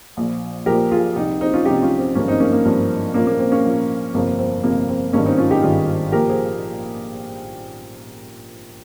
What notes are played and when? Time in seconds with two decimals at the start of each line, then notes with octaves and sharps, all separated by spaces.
0.17 A#1 A#2 F3
0.66 A#1 A#2 F3 G4 A#4
0.91 F4 G#4
1.16 C2 C3 F3 D#4 G4
1.41 C4 D#4
1.53 C#4 F4
1.65 C2 C3 F3 D#4 G4
1.82 C#4 F4
1.98 C4
2.15 G#1 G2 F3 A#3 C#4
2.28 C4 D#4
2.40 A#3 C#4
2.52 A#3
2.65 G#1 G2 F3 C4
3.14 A#1 A#2 F3 A#3 C#4
3.27 A#3
3.39 C4
3.52 A#3 C#4
3.64 A#1 A#2 F3
4.14 G1 F2 C3 F3 A#3
4.39 C4
4.63 G1 F2 C3 F3 A#3
4.89 C4
5.13 G#1 G2 D#3 A#3 C#4
5.26 C4 D#4
5.38 C#4 F4
5.50 D#4 G4
5.63 G#1 G2 D#3 F4 G#4
6.12 A#1 A#2 F3 G4 A#4
6.29 G#4 C5